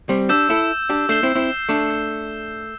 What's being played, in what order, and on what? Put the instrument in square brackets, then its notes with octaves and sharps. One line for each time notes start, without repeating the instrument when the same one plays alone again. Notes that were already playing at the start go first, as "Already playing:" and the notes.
[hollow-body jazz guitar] G3 C4
[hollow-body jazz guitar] D4 G4 [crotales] E6 G6 E7
[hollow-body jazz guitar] E4 A4
D4 G4
[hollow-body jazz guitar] A3 D4 [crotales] G6 C7 E7 G7
[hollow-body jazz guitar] C4 E4
C4 E4
A3 D4
[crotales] E6 G6 C7